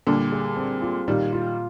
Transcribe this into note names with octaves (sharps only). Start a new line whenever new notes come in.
A#2 D3 G3
G#4
C4
F4
A#2 D#3 G3
F4